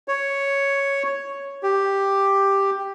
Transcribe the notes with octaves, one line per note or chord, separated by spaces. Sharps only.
C#5
G4